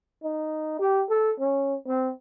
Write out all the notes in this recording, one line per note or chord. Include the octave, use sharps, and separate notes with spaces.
D#4
G4
A4
C#4
C4